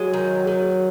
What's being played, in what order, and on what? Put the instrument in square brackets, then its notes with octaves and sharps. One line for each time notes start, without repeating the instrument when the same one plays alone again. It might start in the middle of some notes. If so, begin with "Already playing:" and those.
Already playing: [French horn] F#3 [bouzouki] G#3
[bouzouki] D#3
D#3